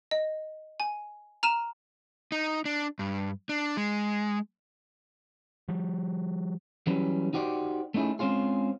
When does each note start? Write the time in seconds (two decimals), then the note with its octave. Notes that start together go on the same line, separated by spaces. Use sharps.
0.11 D#5
0.80 G#5
1.43 A#5 F6 D#7 E7
2.32 D#4
2.65 D4
2.99 G2
3.49 D4
3.77 G#3
5.69 F3 G3
6.87 E3 F#3 G3 C#4 B4
7.33 D#4 F#4 G4 C5 D5
7.94 A3 C#4 D#4 E4 G#4
8.19 G#3 C4 C#4 F4 G#4